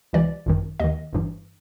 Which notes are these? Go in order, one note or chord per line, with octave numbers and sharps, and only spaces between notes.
C#2 C3 E3 D5
G#1 F#2 D#3
D#2 D#3 D#5
G1 G2 E3